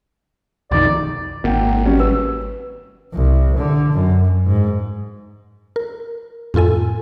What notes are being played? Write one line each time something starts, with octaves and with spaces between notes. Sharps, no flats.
B1 F2 D#3 D5
G#1 A#3 F#5 G5
F#3 G3 C#4
B4 E6
C2
D3
F#2
G#2
A#4
F2 A2 F4 A4 G#5